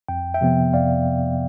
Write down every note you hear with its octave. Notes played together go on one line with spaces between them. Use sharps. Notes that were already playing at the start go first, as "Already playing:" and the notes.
F2 G5
E5 G5
C3 F3 B3
F2 D5 F5